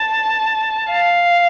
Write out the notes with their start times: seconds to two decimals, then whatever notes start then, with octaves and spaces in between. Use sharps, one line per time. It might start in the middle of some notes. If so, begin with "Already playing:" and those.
Already playing: A5
0.91 F5